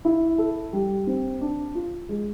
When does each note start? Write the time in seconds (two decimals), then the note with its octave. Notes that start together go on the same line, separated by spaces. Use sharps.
0.05 E4
0.38 A4
0.73 G3
1.07 C4
1.41 D4
1.75 F4
2.09 G#3